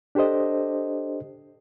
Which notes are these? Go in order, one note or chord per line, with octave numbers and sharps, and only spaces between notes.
D4 G4 A4 C5 D#5